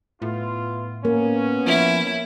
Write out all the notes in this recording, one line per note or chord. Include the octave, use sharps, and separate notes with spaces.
A2 B3 E4 F4
A#3 B3 C#4
F3 E4